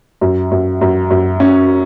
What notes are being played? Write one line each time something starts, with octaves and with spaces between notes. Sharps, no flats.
F#2
F#2
F#2
F#2
C#4